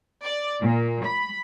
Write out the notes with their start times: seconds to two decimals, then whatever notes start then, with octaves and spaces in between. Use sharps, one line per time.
0.24 D5
0.60 A#2
1.03 B5